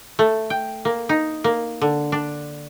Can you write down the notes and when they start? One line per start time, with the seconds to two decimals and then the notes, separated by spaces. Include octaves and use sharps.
0.19 A3
0.50 G5
0.85 A#3
1.09 D#4
1.44 A#3
1.82 D3
2.12 D4